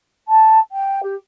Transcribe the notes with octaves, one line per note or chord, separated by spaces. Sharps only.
A5
G5
G4